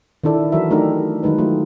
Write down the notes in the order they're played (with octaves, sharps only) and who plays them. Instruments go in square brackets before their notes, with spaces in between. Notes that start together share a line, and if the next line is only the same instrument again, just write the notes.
[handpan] D#3 D4 E4 A4 D5
E3 F#3 F#4 A#4 E5
A3 D4 D#4 G4 A#4
D#3 F#3 G#3 D#4 B4
F#3 A3 F4 G4